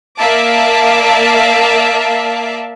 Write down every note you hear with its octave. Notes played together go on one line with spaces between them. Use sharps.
A#3 D5 E5 F5 A5 D6